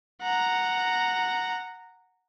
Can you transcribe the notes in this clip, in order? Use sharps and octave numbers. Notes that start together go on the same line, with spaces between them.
F#5 A#5